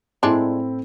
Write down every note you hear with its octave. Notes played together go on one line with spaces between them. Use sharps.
A2 G#3 C4 D4 E4